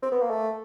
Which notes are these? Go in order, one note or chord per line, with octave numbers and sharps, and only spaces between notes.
C4
B3
A#3
A3